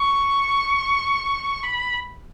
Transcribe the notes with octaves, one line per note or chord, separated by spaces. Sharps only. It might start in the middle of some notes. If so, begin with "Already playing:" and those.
Already playing: C#6
B5